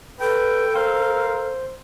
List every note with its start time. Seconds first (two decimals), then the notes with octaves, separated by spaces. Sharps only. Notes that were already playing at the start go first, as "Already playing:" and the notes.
0.21 A4 B4 G5
0.75 A#4 C5 F5